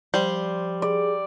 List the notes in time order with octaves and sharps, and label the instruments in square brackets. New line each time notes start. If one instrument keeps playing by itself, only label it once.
[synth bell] F3 C5 C6 [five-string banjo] G3
[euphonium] G#4 [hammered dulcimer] D5